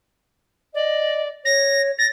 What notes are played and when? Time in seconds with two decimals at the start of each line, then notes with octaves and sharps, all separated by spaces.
0.74 D5 D#5
1.45 C#5 A#6
1.98 A6 A#6